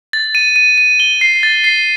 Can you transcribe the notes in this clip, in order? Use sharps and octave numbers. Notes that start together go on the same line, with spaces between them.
A6
D#7
D#7
D#7
G7
C7
A6
C7